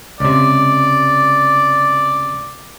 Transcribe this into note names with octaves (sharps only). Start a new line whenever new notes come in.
C#2 C3 D5